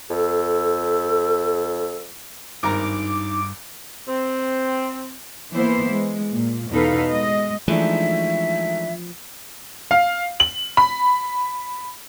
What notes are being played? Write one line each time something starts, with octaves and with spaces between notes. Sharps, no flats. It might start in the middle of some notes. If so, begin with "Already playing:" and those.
F2 A4
G#1 G2 D#4 A#4 A#5 D6
C4
E3 A#3 B3 E4 C5
G#3
A#2
E2 B2 D#4 A4 B4 F5
G#3 D#5
E3 F3 G#3 A3 D4 D#4 E5
F5
F#7
B5